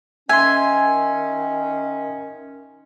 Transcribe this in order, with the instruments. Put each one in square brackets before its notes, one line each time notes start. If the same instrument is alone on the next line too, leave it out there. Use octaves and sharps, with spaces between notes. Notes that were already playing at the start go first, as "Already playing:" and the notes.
[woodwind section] D#3 C#4 [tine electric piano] E5 C6 [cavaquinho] G#5